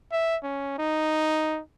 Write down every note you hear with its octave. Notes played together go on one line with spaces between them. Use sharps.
E5
C#4
D#4